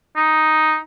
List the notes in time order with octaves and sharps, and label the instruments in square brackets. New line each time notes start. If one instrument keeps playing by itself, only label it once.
[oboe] D#4